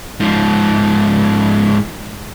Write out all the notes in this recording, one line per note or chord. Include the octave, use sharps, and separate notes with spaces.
G#2 F3